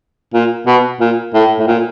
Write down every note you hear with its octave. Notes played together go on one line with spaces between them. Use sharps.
A#2
B2
A#2
A2
A2
A#2